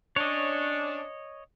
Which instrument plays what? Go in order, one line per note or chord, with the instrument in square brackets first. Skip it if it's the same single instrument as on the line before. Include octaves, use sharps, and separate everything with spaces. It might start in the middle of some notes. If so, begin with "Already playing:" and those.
[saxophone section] C#4 D4 [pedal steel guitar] C#5 D#5